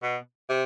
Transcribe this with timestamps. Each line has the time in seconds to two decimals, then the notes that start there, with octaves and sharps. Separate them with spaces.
0.03 B2
0.50 C3